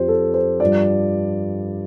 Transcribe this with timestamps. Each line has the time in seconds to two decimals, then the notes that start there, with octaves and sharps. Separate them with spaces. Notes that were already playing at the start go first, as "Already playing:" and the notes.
Already playing: F2 F3 G4 C5
0.08 A4
0.34 C5
0.60 G2 F3 D5